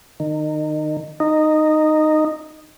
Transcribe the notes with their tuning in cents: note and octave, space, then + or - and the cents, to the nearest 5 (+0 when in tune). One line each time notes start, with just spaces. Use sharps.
D#3 -25
D#4 -10